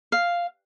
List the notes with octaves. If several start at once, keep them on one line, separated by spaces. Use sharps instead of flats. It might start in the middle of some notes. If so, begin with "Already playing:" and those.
F5